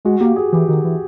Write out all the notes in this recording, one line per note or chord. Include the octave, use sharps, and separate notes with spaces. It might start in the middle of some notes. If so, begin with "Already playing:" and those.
G#3 F#4
A#3 G4
G#4
E3 G4
D#3 F#4
E3